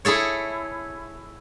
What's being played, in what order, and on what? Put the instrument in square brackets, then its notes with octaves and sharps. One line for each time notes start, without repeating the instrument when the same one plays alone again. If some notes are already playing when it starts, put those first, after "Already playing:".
[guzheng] E4 G#4 A4 C#5